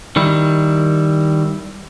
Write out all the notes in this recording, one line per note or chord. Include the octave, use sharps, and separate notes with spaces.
D#3 G3 E4